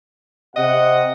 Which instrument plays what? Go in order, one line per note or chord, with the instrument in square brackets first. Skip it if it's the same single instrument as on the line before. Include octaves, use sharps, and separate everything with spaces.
[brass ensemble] C3 F#5 [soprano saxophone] D#5